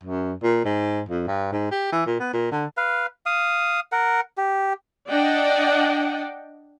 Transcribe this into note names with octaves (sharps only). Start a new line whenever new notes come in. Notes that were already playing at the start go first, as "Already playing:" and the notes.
F#2
A#2
G#2
F2
G2
G#2
G4
E3
A#2
B3
A#2
D3
B4 F5
F5 D#6
A#4 F#5
G4
D4 D5 D#5 F#5 G5